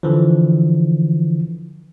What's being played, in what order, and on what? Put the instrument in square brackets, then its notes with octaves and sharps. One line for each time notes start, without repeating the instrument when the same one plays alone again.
[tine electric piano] D3 E3 F3